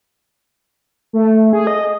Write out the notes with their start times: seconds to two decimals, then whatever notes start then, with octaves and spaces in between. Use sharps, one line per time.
1.13 A3
1.53 G#4
1.67 D#5